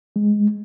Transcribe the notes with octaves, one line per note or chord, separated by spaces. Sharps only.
G#3